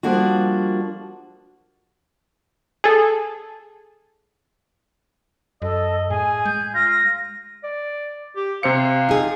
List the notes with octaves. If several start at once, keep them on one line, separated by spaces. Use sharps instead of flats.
F3 G3 A#3 D4 F#4
G#4 A4
F#2 A4 D#5
A2 G#4 G#5
G#3 G6
F4 A#6
D5
G4
C3 C5 F5 C#7
D#4 G#4